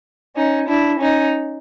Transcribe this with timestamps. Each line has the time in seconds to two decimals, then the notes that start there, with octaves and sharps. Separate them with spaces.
0.37 C#4 D#4
0.68 D4 E4
1.01 C#4 D#4